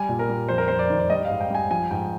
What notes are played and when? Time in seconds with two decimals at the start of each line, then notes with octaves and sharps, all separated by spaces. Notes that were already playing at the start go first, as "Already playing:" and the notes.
Already playing: G3 G#5
0.09 A#2
0.19 A#4
0.29 G3
0.49 F2 C5
0.58 A#4
0.68 F2 C5
0.79 D5
0.90 D#3
0.99 D5
1.10 G3 D#5
1.25 G#2 F5
1.40 G5
1.50 G3 G#5
1.71 F3 G#5
1.91 G#2 G5